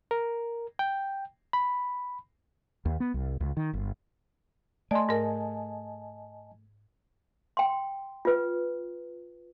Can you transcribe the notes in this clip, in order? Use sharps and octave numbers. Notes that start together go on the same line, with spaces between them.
A#4
G5
B5
D#2
B3
C2
C#2
D#3
G1
A3 D5 D#5 G#5 A5 C6
G#2 A#4
G5 C6
F4 B4